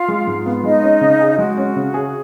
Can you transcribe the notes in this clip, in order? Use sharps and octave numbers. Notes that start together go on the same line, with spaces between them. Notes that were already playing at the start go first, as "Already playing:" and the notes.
Already playing: F4 F5
G#3
G#2
B3
G#3 D#4 D#5
C#4
C#3
G#4
G#3 F#4
C#4
C#3
G#4